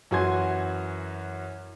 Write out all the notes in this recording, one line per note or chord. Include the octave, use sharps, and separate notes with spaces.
F#2 E3 F#4 G#5 C6 G#6